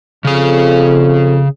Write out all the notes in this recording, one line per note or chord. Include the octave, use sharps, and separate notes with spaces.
F2 C#3 G#4